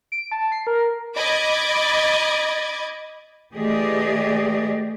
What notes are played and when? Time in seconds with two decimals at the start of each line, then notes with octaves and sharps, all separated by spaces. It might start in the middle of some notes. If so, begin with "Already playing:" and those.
0.12 D7
0.32 A5
0.52 C7
0.67 A#4
1.16 D#5 B5 D6 G#6 A6
3.54 E3 A3 G4 G#4 D5 D#5